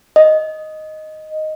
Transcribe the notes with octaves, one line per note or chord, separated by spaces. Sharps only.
D#5